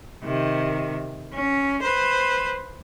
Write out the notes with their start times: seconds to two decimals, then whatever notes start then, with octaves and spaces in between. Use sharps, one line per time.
0.24 C3 D#3
1.34 C#4
1.82 B4 C5